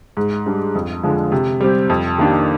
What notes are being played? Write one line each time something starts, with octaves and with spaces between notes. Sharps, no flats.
G#2
G3 D4
F2
D3 F3 G#3
C3
G3 C4 G4
F2
D#3 A#3 D4 G4